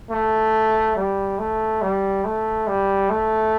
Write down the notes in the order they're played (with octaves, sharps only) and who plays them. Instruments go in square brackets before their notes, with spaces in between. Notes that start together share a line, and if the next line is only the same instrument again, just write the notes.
[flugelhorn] A3
G3
A3
G3
A3
G3
A3